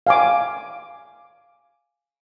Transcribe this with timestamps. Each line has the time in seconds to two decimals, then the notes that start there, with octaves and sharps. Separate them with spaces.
0.07 F5 G#5 D6